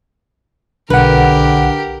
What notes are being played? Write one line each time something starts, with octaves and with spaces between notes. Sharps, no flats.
B1 D3 G4 A#4 B4 F#5